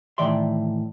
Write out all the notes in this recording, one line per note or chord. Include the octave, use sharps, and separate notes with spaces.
A2 D#3 E3 D5 E5 C6